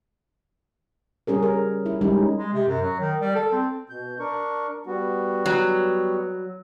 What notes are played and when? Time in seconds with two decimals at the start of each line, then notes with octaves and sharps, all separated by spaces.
1.27 G3 C#4 G#4 A#4
1.43 A#4
1.86 E4
2.01 G3 G#3 C#4 D#4
2.38 G#3
2.54 C3
2.68 F#2
2.82 F#3
3.00 D#3
3.21 G3
3.35 A4
3.52 C4
3.90 B2 G6
4.20 D4 A#4 C#6
4.86 G3 B3 F#4
5.46 F#3